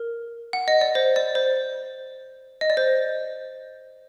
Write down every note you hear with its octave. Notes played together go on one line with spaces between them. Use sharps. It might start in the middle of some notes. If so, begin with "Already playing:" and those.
Already playing: A#4
F#5
D#5
D5
C5
D5
C5
D#5
D5
C5